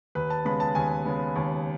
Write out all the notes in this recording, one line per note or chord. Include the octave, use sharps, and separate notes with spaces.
D#2 B4
A5
C#3 G#3 B3 B5
A5
D#2 G#5
C#3 G#3 B3
D#2